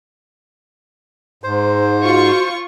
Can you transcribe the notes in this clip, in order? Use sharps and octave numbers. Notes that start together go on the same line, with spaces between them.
G#2 C5
F4 F#4 C#6